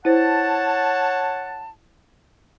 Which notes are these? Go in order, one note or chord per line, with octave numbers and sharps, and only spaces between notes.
E4 C5 C#5 F#5 A5